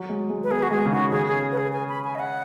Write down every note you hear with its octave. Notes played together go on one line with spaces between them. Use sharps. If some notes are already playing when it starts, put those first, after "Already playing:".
Already playing: F#3
G#3
G#3
B4
B3 G#4
F#4
G#3 G#4
C#3
D#3 F#4
C#3 G#4
G#4
B4
G#4
G#5
B5
G#5
D#5
F#5